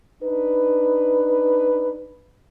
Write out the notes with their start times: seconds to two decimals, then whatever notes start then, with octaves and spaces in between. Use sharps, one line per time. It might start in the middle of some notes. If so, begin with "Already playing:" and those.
0.23 D4 D#4 B4